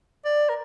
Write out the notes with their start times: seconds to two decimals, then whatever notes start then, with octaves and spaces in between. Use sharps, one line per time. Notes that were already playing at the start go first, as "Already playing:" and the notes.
0.25 D5
0.49 A#4